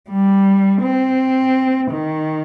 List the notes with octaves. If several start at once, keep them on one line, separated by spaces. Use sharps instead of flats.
G3
C4
D#3